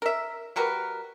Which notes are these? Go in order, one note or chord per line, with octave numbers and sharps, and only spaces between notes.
A#4 E5
G3 F#4 A#4 B4